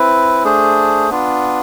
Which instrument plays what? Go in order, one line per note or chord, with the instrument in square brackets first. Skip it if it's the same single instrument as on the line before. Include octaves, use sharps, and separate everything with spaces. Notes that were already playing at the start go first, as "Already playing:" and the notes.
Already playing: [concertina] C4 E4 B4
A3 D4 G#4 C5
B3 D4 F4